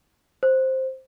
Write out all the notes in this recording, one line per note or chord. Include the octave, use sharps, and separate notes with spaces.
C5